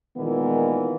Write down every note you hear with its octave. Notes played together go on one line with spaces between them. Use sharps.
A#2 D#3 E3 G#3 A#3 B3